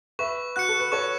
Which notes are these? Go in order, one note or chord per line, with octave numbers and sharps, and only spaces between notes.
B4 E5 C#6
F#4 F#6 C#7
A4
B4
A4 C#5 C#6